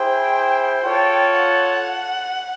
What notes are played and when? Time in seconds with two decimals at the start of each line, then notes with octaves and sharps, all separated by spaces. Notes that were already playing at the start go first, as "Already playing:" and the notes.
Already playing: E4 G#4 C5 G5
0.81 F4 A4 C#5 G5
1.35 F#5